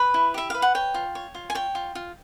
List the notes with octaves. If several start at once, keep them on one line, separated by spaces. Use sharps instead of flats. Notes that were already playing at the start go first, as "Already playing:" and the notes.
Already playing: B4 B5
E4
G4 E5
B4 F5
F#5
C#5 G5
F4
C#5
F4
G#5
C#5 G5
F4
F4